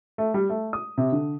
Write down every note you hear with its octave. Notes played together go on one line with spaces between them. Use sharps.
A3
G3
A3
D#6
C3
D3